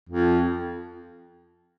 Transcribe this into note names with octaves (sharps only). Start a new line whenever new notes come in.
F2